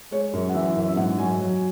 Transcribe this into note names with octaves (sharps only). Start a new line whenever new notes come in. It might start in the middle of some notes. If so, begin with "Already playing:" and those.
G#3 C#5
F#2
F#5
E3 E5
F#2
E5
G#2 F#5
F#3 G#5
F#3